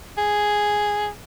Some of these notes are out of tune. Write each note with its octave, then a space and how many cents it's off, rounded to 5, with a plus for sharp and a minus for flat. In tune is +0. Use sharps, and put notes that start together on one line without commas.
G#4 +0